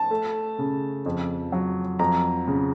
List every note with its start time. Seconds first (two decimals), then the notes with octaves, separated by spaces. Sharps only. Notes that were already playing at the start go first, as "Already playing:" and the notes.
Already playing: A5
0.11 A3
0.59 C#3
1.06 F2
1.52 F#3
1.99 F2 A#5
2.47 C#3